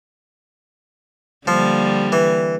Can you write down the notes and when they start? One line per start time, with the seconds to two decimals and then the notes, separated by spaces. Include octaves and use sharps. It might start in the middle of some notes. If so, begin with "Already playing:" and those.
1.47 D3 F3 G3 A#3
2.12 E3